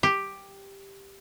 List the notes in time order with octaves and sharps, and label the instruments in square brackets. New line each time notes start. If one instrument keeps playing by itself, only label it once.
[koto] G4